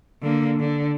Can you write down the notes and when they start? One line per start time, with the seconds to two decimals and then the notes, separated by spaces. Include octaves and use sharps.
0.22 D3 A#3
0.60 D3